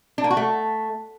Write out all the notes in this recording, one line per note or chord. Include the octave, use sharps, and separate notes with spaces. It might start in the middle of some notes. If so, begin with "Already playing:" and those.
D4
A#3
F#4
A3